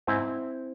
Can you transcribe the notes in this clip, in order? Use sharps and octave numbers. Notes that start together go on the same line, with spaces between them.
G#2 C4 E4